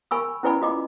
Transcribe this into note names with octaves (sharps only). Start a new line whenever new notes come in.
A#4 G#5 B5 C#6 E6
C#4 E4 B4 D5 G#5 B5
F4 D#5 D6